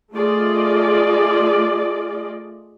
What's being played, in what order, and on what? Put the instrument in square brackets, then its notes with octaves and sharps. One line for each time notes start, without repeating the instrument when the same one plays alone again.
[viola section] A3 F4 G#4 D5 D#5